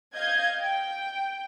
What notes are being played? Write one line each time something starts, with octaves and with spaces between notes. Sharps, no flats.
D#5 F5 G6 G#6
G5